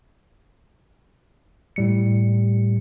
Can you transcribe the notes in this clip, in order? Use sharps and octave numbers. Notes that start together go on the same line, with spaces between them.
A2 G3 C#7